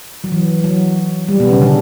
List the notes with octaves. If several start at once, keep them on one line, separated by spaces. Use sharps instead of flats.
F#3
E3
F#3
G3
B2 B3
C#3 C#4
D3 D4